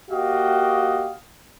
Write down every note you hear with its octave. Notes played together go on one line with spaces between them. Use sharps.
A#3 F#4 G4 D#5 F5 G5